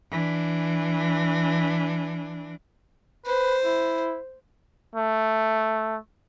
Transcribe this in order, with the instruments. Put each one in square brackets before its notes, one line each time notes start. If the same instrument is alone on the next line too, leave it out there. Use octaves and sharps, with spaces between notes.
[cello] E3 D4
[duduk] B4 [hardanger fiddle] C5
[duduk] E4
[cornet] A3